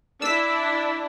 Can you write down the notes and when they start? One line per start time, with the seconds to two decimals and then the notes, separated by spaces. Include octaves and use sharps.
0.22 D4 E4 E6 B6